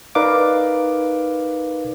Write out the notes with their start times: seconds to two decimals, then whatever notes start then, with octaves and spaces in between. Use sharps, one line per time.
0.15 D#4 A#4 B4 D5 F5 D6